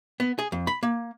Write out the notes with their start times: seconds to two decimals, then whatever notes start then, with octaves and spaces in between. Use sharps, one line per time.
0.20 B3
0.39 G#4
0.52 F2
0.67 B5
0.83 A#3